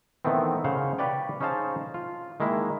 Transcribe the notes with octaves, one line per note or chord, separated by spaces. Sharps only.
D#3 E3 A3 B3 C4
C#3 C5 F5 F#5
G4 B4 C#5 D5 G5
C#4 D#4 G#4 C5 F5 A5
F4
D#3 G#3 A#3 E4